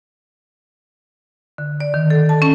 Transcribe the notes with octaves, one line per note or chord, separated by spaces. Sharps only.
D3
D5
D#3
A4
A5
C#4